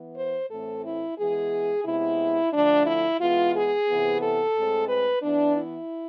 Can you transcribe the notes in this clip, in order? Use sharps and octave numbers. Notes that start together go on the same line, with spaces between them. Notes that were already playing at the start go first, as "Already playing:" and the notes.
Already playing: E3 B3
C5
A2 E3 A3 C4 A4
E4
E3 G#3 B3 G#4
C3 G#3 B3 E4
D3 F3 A3 D4
E4
E3 G#3 B3 F4
G#4
C3 E3 B3
A4
A2 G#3 C4
B4
E3 B3 D4
E4